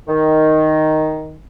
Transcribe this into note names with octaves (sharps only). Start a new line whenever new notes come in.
D#3